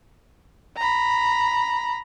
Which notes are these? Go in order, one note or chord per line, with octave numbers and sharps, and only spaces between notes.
A#5 B5